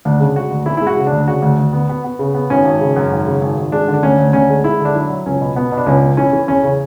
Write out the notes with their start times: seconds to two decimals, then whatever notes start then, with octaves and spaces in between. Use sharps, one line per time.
0.05 D2 D4
0.20 C#3
0.36 G#3 F#4
0.51 D2
0.66 E3 E4
0.77 G#3 E4
0.87 F#4
0.96 C#3
1.07 D2 D4
1.28 C#3 F#4
1.42 D2
1.59 D2
1.73 B3
1.89 B3
2.04 B3
2.19 C#3
2.34 B3
2.50 G#1 C#4
2.65 G#1
2.81 C#3
2.96 F#2
3.11 G#1
3.26 C#3
3.41 G#1
3.57 G#1
3.72 G#3 D4
3.88 D3
3.94 D4
4.03 D2 C#4
4.18 D2
4.33 D2 C#4
4.49 G#3
4.64 G#3 E4
4.79 D3
4.85 D4
4.95 F#3 E4
5.10 F#3
5.26 C#2 C#4
5.41 B2
5.56 B2 B3
5.72 B2
5.77 D4
5.86 C#2 C#4
6.02 B2
6.17 E3 C#4
6.33 E3
6.48 E2 C#4
6.63 C#3